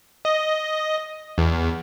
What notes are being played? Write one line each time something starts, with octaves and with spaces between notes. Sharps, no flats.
D#5
E2